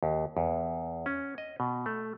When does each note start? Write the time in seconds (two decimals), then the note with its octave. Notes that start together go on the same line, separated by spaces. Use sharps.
0.03 D#2
0.37 E2
1.06 C#4
1.38 D#5
1.60 B2
1.86 A3